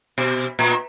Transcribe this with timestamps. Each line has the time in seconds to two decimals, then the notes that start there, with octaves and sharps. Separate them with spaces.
0.18 B2
0.59 A#2